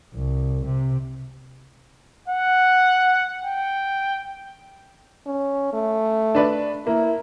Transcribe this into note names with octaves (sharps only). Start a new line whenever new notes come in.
C2
C3
F#5
G5
C#4
A3
D4 B4 D5
A#3 E4